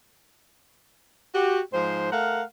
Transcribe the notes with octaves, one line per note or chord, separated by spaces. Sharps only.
F#4 G4
G#2 F3 C5
A3 A#4 F5 F#5